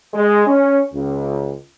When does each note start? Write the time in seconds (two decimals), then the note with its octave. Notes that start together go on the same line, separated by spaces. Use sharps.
0.14 G#3
0.47 C#4
0.94 C#2